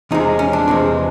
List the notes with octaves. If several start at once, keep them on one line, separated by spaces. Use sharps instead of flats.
E2 C3 F3 G#3 D#4
C#4
D4
E2 C3 F3 G#3